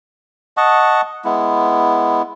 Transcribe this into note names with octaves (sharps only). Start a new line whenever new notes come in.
D#5 F#5 A5 C#6
G#3 B3 E4